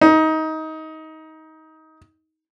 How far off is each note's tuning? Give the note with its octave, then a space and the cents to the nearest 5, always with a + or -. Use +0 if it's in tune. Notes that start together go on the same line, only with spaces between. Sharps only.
D#4 +20